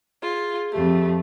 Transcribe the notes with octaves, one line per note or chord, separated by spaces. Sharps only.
F4 G#4
F2 A3 G4